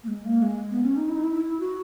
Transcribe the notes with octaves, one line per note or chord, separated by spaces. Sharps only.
A#3
G#3
A#3
G#3
B3
C#4
D#4
E4
D#4
E4
F#4